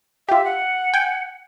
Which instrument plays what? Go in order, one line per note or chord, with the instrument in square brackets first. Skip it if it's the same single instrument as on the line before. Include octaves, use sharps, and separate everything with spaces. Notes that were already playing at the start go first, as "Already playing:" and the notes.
[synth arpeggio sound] F4 G4 [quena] E5
[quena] F#5
[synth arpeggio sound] G5 G#5